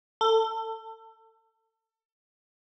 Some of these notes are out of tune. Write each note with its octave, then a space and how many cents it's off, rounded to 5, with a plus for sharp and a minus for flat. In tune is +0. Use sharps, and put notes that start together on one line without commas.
A4 +25